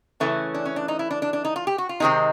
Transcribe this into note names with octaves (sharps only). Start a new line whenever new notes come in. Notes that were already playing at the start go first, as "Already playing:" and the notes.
C#3 E3 A3 C#4
D4
C#4
D4
D#4
E4
D4
D4
D4
D#4
F4
G4
F#4
F4
C3 D#3 G#3 C4 D#4